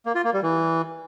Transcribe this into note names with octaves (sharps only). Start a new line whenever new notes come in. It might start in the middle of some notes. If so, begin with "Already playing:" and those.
A#3
F4
A#3
G3
E3